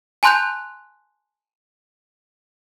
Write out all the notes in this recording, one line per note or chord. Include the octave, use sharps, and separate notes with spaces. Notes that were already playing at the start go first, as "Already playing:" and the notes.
G#5 A5 C6 F#6 G6 F7